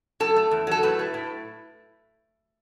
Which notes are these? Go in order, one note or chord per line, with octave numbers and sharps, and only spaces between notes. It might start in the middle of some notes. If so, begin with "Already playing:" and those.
F#2 A4
A3
E2
F#3 A4
A2 B4
A3
A2